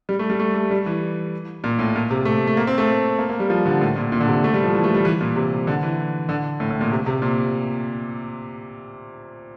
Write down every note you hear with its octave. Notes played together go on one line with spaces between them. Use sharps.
G3
A3
G3
A3
A3
G3
E3
A#2
A2
A#2
C3
A3
A3
A#3
C4
A3
A#3
A#3
G3
F3
D3
A2
A#2
A#2
D3
C3
A3
G3
F3
E3
A3
G3
E3
A#2
C3
D3
E3
D3
A2
A2
A#2
C3
C3
A#2